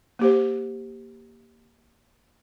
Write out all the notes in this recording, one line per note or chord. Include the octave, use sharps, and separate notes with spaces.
A#3 G4 C5